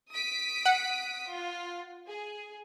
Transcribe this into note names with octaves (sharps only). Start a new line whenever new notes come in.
D#6 B6 D7
F#5
F4
G#4